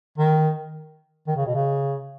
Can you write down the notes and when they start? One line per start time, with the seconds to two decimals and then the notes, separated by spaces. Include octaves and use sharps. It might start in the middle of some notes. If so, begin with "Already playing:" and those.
0.18 D#3
1.27 D#3
1.37 C#3
1.46 B2
1.55 C#3